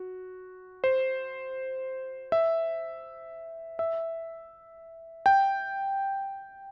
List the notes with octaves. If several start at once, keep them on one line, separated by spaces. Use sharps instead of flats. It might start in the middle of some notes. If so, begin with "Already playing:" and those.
Already playing: F#4
C5
E5
E5
G5